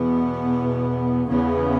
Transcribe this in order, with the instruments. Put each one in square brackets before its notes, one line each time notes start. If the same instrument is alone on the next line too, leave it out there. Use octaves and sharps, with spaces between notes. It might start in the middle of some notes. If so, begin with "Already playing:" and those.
Already playing: [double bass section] E2 B2 B3
E2 C#3 B3